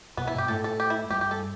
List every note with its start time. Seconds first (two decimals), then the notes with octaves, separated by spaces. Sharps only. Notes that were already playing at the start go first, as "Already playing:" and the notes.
0.17 B2 B3
0.27 E4
0.33 G2
0.38 G4
0.48 A2 A4
0.64 A4
0.80 G4
0.90 E4
1.10 G2 G4
1.21 G4
1.31 A4